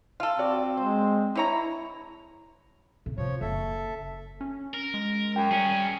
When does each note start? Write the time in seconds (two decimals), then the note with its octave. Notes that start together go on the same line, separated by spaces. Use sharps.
0.20 F4 A4 F5
0.38 C4 F#4 D5
0.77 G#3 C5
1.36 D3 E4 C#5 A#5
3.06 A2 C3
3.18 C3 F3 C#5
3.41 F#1 A4 E5
4.41 C#4
4.74 A#4
4.94 G#3
5.36 F#2 G5
5.51 G3 C#4 G#4 A#4